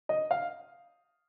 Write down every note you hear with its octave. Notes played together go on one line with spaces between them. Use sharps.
D#5
F5